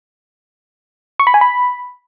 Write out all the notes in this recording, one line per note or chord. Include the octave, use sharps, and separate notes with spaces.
C#6
B5
G#5
B5